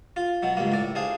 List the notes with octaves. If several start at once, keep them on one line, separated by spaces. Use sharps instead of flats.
F4
B2 F#3
C#2 G2 A#3
A2 D5
D4 G#4 C5 F5